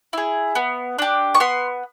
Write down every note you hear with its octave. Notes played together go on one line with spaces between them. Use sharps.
E4 G#4
B3
D4 G4
C#6
B3 C6